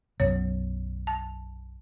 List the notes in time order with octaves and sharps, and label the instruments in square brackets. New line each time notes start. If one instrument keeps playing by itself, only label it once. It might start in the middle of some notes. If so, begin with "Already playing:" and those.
[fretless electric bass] B1 F#2 [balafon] C#5
[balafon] A5